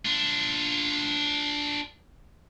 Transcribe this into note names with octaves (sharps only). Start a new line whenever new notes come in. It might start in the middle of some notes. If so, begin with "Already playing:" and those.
D4 F4